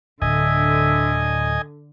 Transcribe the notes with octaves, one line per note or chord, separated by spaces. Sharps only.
D1 D3 D#5 E5 G#5